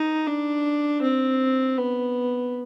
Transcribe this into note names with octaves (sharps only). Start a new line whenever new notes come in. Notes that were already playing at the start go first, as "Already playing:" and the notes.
Already playing: D#4
D4
C4
B3